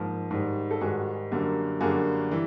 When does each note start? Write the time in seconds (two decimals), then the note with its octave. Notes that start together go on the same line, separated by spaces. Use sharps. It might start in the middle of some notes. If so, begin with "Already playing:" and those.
Already playing: G#2 F3 A#3
0.31 G#2 D#3 G3
0.71 A4
0.81 G#2 D#3 G3 F#4 G#4
1.31 F#2 D3 G3 A#3
1.81 F#2 D3 G3 A#3 F#4 G#4
2.31 E3 G3